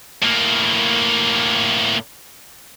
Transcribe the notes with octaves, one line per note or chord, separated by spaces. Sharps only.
A2 A#3